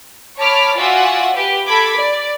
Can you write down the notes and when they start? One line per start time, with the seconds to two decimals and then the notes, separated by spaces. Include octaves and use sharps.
0.39 C#5 A5 B5 D6 F6 D7
0.77 F4 F#4 D5 E5 F#5 G#5
1.34 G4 B4
1.67 A4 B5 D6 G#6
1.97 D5